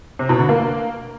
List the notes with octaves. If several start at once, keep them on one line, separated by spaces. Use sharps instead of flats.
C3
B2
D3
A#3